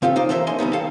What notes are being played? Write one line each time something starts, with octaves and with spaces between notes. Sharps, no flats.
C#3 C4 F4 G4 A4
D#4 F4 C5 D5
E3 F3 A#3 A4 C5 E5
A3 C#4 D#5 G#5 C6
D2 G3 B3 D#4
D#3 A4 F5 A5